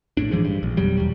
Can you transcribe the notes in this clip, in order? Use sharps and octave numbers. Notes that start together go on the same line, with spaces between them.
A#1 A2 D4
G1 E3 F3 G#3
G2
A#1
F1 B2 F#3 G3
E2 G3